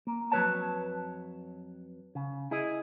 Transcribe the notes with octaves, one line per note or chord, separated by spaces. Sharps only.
A#3
F2 F#3 G3 B4 C#5 A5
C#3
E4 G#4 D#5